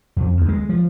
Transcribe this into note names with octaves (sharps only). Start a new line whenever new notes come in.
F2
D2
G#3
F3